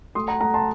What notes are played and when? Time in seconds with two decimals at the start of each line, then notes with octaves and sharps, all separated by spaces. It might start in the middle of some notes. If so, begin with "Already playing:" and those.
0.15 A3 C6 D#6
0.28 F#5 A#5
0.41 A3 F#5 A#5
0.54 A5 C6